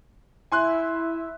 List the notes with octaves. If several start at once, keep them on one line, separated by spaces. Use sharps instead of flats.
E4 E5 G#5 C6 F#6